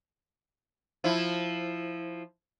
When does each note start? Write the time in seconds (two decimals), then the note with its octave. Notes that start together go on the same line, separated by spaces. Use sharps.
1.04 F3 E4